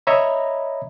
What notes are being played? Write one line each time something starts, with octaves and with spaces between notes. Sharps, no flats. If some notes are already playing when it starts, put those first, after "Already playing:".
C#5 D#5 E5 A#5 B5